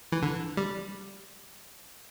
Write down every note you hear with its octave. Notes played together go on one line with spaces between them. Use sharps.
E3
D3
G3